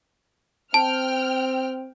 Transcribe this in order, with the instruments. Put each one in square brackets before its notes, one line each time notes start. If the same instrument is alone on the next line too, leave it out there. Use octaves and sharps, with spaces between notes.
[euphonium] C4 [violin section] G5 F6 [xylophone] A5